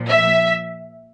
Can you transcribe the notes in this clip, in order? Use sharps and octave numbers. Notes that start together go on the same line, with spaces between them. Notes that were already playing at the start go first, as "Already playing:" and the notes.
Already playing: A#2 F3
E5